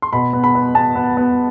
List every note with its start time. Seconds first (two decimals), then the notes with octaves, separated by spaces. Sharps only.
0.02 C6
0.13 B2 B5
0.33 B3
0.44 B5
0.55 B3
0.75 B3 A5
0.95 B3
1.17 B3